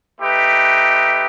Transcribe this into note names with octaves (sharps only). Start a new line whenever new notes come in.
A3 D#4 G4 B4